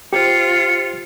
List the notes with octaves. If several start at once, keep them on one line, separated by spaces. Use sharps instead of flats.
F4 G4 C5 C#7